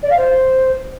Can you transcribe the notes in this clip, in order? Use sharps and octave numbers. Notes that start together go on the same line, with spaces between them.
D5
F5
C5